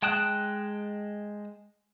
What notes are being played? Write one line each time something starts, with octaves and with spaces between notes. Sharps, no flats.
G#3 G5 A5 D#6 F#6